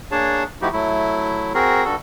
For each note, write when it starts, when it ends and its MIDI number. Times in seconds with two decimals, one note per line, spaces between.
0.11 0.44 58
0.11 0.44 62
0.11 0.44 68
0.11 0.44 73
0.11 0.44 81
0.62 0.69 53
0.62 0.69 57
0.62 0.69 63
0.62 0.69 64
0.62 0.69 66
0.62 0.69 67
0.73 1.53 54
0.73 1.53 57
0.73 1.53 64
1.54 1.84 60
1.54 1.84 66
1.54 1.84 68
1.54 1.84 70
1.85 1.96 43
1.85 1.96 55
1.85 1.96 66
1.85 1.96 69